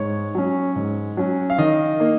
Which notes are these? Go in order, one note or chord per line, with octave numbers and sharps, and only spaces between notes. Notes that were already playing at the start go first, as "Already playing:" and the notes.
Already playing: G#2 C#5
F#3 C#4
G#2
F#3 C#4
F5
D#3 D#5
A#3 D#4